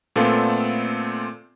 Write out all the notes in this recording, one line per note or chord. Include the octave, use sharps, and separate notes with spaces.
A#2 A3 B3 C4 F4 A4